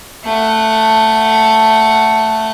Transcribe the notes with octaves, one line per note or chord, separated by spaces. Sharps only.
A3 F#5